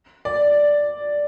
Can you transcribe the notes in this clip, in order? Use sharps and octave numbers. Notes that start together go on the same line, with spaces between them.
D5